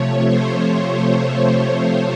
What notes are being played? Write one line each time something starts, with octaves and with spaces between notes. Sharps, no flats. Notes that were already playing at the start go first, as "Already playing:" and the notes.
Already playing: C3 F3 A3 C#5
C5